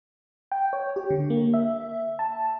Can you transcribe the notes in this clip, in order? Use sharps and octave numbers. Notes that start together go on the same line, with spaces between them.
G5
C#5
G4
D3
A#3
E5
A5